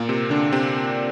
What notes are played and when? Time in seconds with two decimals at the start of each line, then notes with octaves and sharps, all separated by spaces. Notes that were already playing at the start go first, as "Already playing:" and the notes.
Already playing: A#2 A#3
0.09 C3 C4
0.30 D3 D4
0.52 C3 C4